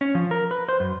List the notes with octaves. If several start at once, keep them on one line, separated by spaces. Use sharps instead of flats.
C#4
F3
A#4
B4
C5
F#2